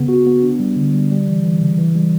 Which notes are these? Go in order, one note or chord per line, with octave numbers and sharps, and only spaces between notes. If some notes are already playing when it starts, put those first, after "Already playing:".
Already playing: C#3 B3
F#4
B3
D4
G3
D3
G3
G3
E3
E3
C#3
E3
G3